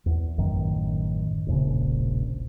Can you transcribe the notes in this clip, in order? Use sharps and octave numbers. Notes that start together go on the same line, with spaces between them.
E2
A1 F#2 D#3
E1 A#1 C#3